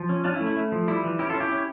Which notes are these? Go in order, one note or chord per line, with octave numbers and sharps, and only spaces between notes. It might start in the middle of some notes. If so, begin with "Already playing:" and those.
Already playing: F3
C#4
C#4 D4 F4
E4
A3
E4
A3
F3
G3 E4
E3
C#4 E4 G4
F4 A4
C#4
E4 G4
C#4